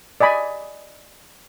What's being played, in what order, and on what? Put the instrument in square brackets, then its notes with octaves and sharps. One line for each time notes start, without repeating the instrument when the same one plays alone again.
[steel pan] D5 D#5 G#5 B5